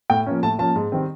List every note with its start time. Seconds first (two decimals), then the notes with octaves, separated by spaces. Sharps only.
0.10 A2 G5
0.26 F3 A#3 C#4
0.43 A2 A5
0.59 F3 A#3 C#4 A5
0.76 G#2
0.92 D#3 G3 C4